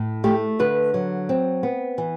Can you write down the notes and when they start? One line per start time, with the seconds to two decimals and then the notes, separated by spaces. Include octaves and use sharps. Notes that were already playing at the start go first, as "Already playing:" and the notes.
Already playing: A2
0.24 A3 G4
0.59 D3 B4
0.94 F#3
1.29 C4
1.63 B3
1.98 E3